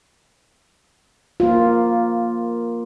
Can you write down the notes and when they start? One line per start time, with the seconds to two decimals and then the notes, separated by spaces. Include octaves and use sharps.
1.40 A#3 F4